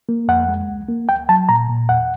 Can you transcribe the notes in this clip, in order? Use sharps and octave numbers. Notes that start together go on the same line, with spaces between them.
A#3
F2 F#5
G#3
C#2
A#3
D2 G5
F#3 A5
A#2 A#5
A#2
E2 F#5